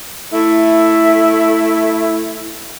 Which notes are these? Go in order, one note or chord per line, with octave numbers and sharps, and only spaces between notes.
A3 E4